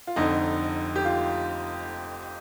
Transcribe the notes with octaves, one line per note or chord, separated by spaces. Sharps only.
F4
F1 F2 D3 D#4
G4
F4